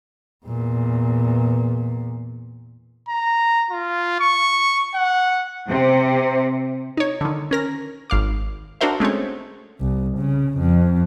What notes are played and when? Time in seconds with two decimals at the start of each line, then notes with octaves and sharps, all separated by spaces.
0.46 E2 A#2
3.08 A#5
3.71 F4
4.20 C#6
4.95 F#5
5.68 C3
6.97 D#4 C#5
7.21 D3 D#3
7.51 C#4 A#4 A#6
8.10 G#1 F5 D6
8.81 D4 F#4 A#4 C5 E5
9.00 G#3 A3 C4 C#4 C#5
9.81 C2
10.18 C#3
10.59 F2